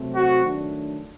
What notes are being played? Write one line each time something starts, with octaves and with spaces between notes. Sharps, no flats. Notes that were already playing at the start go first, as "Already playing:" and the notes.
Already playing: C3 F#3 A3 C4
F#4
D#3 F#3 A3 D4